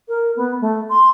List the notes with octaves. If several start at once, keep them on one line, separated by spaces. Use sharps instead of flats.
A#4
B3
A3
C6